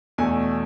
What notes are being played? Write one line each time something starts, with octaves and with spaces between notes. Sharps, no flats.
E2 B2 A3 G#5